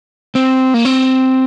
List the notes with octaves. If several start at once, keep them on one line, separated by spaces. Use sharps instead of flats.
C4
A#3
C4